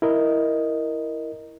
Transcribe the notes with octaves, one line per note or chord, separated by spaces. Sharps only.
E4 A#4 D#5